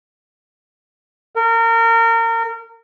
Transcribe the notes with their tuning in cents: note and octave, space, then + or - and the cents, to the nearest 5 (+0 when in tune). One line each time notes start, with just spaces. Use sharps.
A#4 -30